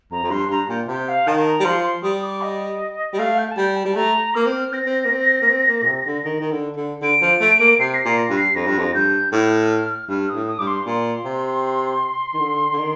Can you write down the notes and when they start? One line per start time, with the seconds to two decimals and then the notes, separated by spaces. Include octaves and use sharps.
0.11 F2 A#5
0.23 F2
0.30 G2 C6
0.50 G2 A#5
0.69 A#2 G5
0.88 C3 G5
1.08 F5
1.26 D#3 A5
1.46 A#5
1.60 G3
1.64 F3 C6
1.83 C6
2.03 G3 D#6
2.23 D6
2.41 D#5
3.13 G3
3.18 A3 F5
3.37 G5
3.50 A5
3.56 G3 G5
3.76 A5
3.85 G3
3.95 A3 A#5
4.34 A#3 F6
4.46 C4
4.72 C4 A#6
4.86 C4
5.05 A#3
5.11 C4
5.42 A#3
5.49 C4
5.68 A#3
5.82 A#2
5.86 C3
6.06 D3
6.25 D#3
6.40 D#3
6.51 D3
6.76 D3
7.01 D3 D7
7.21 F3
7.40 A3
7.60 A#3
7.79 C3 C7
7.94 A#6
7.97 C7
8.05 A#2
8.18 A#6
8.30 G2
8.36 C7
8.55 F2 A#6
8.67 G2
8.78 F2
8.94 G2 G6
9.32 A2 F6
10.09 G2 F6
10.29 D#6
10.34 A2
10.47 D#6
10.58 G2 D6
10.66 C6
10.85 A#2 C6
11.24 C3
12.34 D#3
12.39 D3
12.72 D3
12.78 D#3